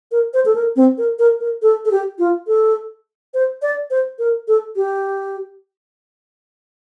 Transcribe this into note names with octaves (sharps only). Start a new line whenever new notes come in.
A#4
C5
A4
A#4
C4
A#4
A#4
A#4
A4
A4
G4
F4
A4
C5
D5
C5
A#4
A4
G4